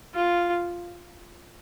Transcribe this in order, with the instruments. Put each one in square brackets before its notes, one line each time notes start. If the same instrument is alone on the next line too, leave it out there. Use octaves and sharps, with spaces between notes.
[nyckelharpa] F4